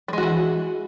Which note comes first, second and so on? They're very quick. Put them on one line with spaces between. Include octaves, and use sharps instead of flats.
G3 G#3 F#4 E3